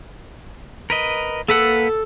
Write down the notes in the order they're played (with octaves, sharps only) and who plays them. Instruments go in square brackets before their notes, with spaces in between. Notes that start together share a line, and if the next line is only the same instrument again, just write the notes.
[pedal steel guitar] A#4 B4 D#5
[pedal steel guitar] A#3 B4 F#5 [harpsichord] A4